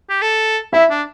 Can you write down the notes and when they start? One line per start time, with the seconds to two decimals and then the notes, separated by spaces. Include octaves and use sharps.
0.10 G4
0.22 A4
0.73 E4 E5
0.90 D4